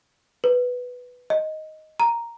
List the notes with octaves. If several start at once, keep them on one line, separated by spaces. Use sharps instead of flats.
B4
D#5
A#5